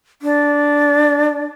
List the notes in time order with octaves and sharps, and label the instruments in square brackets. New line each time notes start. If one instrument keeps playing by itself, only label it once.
[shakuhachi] D4